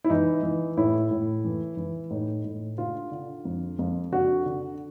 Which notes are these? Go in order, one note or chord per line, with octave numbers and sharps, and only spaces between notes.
E4
E3 D#4
E3
A2 E4
A2
E3
E3
A2 D#4
A2
D3 F4
D3
F2
F2
D3 F#4
D3